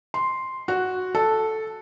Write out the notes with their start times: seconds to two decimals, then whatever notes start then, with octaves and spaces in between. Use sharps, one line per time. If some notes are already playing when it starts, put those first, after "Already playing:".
0.14 C6
0.68 F#4
1.15 A4